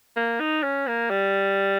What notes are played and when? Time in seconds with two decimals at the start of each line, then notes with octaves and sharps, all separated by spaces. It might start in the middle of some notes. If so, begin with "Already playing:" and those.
0.16 A#3
0.40 D#4
0.63 C#4
0.87 A#3
1.10 G3